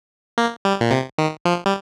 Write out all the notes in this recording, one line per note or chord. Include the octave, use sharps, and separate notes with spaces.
A#3
G3
A#2
C3
D#3
F3
G3